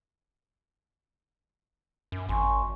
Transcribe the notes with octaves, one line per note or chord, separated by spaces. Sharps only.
F#2
G#1 G#5 C6 C#6